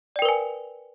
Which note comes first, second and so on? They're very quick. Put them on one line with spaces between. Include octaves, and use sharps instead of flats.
D5 G5 A#4 B4 G#5